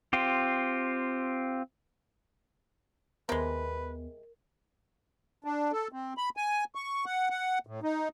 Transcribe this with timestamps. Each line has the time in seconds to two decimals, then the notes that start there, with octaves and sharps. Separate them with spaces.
0.13 C4 F4 G4
3.29 D#2 C3 G#3 B3 A#4 B4
5.44 D4
5.72 A4
5.92 C4
6.17 B5
6.37 G#5
6.75 C#6
7.06 F#5
7.30 F#5
7.67 A2
7.83 D#4